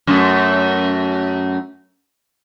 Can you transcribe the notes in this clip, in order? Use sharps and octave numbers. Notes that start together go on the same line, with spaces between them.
F#2 A3